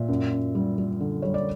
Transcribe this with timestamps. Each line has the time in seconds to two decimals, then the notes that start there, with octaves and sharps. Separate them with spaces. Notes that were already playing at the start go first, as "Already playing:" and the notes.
Already playing: A#2 E5
0.08 F#2
0.33 F#2
0.55 G3
0.78 G3
1.00 D3
1.22 G3 C#5
1.34 D5